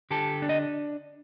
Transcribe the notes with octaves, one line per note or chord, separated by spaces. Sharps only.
D3 G4 A4
D4
D#5